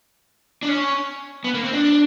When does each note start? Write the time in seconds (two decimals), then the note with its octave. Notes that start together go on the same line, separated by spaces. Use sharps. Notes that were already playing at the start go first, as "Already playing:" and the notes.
0.63 D4
0.69 C#4
1.44 B3
1.54 A#3
1.64 C4
1.73 D4